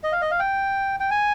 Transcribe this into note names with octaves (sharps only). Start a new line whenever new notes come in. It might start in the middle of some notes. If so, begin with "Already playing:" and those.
D#5
F5
D#5
F5
G5
G5
G#5